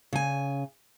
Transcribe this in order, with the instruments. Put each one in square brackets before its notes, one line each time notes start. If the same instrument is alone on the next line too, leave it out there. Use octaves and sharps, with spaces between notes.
[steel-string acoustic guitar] C#3 G#5